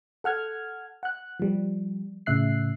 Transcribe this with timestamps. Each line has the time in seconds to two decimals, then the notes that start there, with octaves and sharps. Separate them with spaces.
0.24 A4 F#5 F6 G#6
1.03 F#5 F#6
1.40 F3 G3
2.26 A2 C#3 E5 F#6 C7